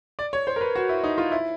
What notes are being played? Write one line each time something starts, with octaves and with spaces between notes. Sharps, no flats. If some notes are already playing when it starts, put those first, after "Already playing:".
D5
C#5
C5
A#4
B4
F#4
E4
D#4
F4
E4